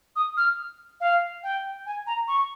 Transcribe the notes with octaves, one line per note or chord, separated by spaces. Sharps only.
D#6
F6
F5
G5
G#5
A#5
C#6